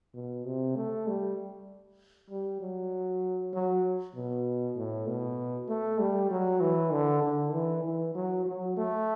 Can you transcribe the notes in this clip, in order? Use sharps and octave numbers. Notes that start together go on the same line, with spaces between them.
B2
C3
A3
G3
G3
F#3
F#3
B2
A2
B2
A3
G3
F#3
E3
D3
D3
E3
E3
F#3
F#3
A3